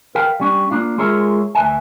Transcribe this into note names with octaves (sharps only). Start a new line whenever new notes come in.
A#4 B4 F5 G5
G3 C#4 D4
A#3 D4 F4
G#3 F4 G#4 A#4 C#5 E5
D2 B4 E5 G#5